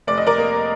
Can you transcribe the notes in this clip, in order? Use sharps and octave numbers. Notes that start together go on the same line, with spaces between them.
F1 D5
D#5
A#4 D5
A#3